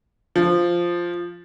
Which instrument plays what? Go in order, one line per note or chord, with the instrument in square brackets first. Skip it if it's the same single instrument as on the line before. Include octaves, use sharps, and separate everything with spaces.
[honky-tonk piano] F3